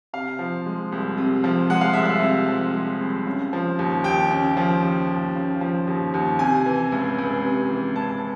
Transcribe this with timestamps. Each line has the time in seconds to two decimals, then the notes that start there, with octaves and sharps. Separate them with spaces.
0.13 C3 F5
0.39 F3
0.66 G#3
0.92 C2
1.17 C3
1.44 F3
1.70 G#3 F#5
1.81 F5
1.93 C2 E5
2.05 F5
2.22 C3
2.49 F3
2.74 G#3
3.01 C2
3.27 C#3
3.53 F3
3.79 D#2
4.04 D#2 G5
4.31 C#3
4.57 F3
4.84 D#2
5.10 D#2
5.36 C#3
5.61 F3
5.87 D#2
6.14 D#2
6.39 C3 G#5
6.66 E3
6.92 C#2
7.19 C#2
7.44 C3
7.70 E3
7.96 C#2 A5